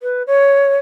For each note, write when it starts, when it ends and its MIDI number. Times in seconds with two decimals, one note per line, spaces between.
0.02 0.22 71
0.27 0.75 73